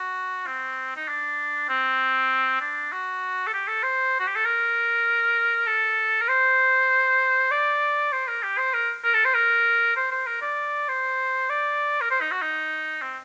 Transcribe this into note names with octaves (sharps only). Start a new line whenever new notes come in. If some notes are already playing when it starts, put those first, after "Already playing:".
Already playing: F#4
C4
D#4
D4
C4
D4
F#4
A4
G4
A4
C5
F#4
G4
A4
A#4
A4
A#4
C5
D5
C5
A#4
G4
C5
A#4
A#4
A4
C5
A#4
C5
C5
A#4
D5
C5
D5
A#4
C5
D#4
F#4
D#4
C4